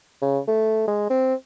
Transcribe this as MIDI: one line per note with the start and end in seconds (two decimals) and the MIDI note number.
0.22 0.39 49
0.48 0.85 57
0.87 1.06 56
1.10 1.34 60